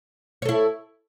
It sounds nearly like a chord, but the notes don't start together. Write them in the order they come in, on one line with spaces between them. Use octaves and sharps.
C#5 A4 E4